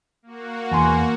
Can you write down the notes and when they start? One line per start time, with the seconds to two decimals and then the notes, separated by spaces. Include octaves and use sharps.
0.22 A#3 F#4
0.71 E2 G#5 C6